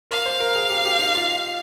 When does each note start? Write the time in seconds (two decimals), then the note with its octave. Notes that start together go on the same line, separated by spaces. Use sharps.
0.11 A#4 F5
0.26 C5
0.40 A#4
0.55 G#4
0.70 G4
0.85 G4
0.99 D#4
1.15 F4